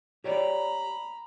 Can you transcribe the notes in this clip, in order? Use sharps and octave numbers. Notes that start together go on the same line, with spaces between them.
G4 C#5 D5 A#5 B5